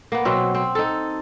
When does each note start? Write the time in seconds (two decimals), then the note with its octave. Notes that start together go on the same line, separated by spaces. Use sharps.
0.12 A#3 B3
0.25 B2 F#3 C4
0.55 C4
0.75 D#4 A4